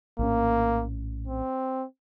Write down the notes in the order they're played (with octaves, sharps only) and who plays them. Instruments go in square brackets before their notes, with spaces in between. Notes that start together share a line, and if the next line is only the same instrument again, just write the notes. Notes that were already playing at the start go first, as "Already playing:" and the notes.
[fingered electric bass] A#1 A2 C#4 [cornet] A#3
[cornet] C4